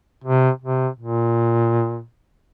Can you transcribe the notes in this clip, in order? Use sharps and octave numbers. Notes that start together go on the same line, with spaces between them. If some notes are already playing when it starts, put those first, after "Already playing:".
C3
C3
A#2